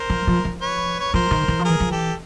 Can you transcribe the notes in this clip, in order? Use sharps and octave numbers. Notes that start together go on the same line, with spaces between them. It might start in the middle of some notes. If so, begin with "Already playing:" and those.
Already playing: A#4 C5
F3
F3
F3
B4 C#5
C#5
F3 A#4 C5
D#3
E3
F3
E3 G#4 A#4
F3
E3 G4 A4